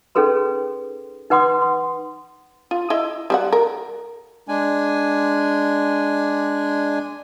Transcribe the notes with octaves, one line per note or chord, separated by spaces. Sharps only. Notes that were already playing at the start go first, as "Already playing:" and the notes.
C#4 D#4 G#4 A4 B4 C6
D#4 B4 F#5 C6 D6 D#6
C6
F4
E4 D#5 E5
G3 F#4 F#5
A#4
G#3 D4 G#5